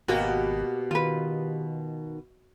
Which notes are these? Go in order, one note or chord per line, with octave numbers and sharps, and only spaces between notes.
G#1 B2 A#3 B3 F#4 G4 G5
D#3 F4 B4